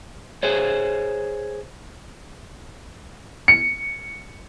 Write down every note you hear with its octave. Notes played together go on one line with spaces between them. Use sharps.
G#4 C5 C#5
C#7